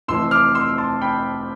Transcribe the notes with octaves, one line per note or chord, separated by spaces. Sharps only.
F1 F2 E3 C6 E6
D6 F6
C6 E6
A5 C6
G5 B5